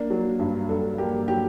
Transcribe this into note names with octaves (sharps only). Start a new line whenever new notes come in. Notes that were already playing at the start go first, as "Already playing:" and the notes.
Already playing: A#3 D4
F#3
G2
G2 A4
A#3 G4
F#3 G4